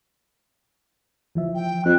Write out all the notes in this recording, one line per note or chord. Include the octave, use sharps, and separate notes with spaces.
E3 F3 E5
G5
F2 F#6